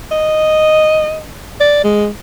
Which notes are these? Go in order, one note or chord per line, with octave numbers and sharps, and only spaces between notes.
D#5
D5
G#3